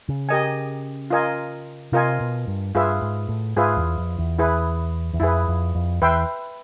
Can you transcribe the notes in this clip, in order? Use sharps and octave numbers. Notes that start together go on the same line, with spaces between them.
C#3
G4 A#4 D#5 G#5
F4 A#4 D#5 G#5
C3 F4 A#4 D#5 G#5
B2
G2
G2 F4 G#4 B4 E5
G#2
A2
G#2 F4 G#4 B4 E5
E2
F2
E2
E4 G#4 B4
E2
F2 E4 G#4 B4
F2
F2
E2 B4 E5 G5 C6